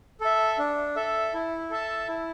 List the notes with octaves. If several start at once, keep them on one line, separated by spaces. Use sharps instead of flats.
A4 E5
D4
A4 E5
E4
A4 E5 A5
E4